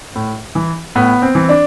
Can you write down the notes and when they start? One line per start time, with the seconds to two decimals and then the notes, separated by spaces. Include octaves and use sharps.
0.16 A2
0.55 E3
0.95 A2 B3
1.22 C4
1.35 E3
1.49 D4